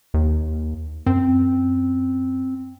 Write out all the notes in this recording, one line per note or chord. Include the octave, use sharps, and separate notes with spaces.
D#2
F#2 C4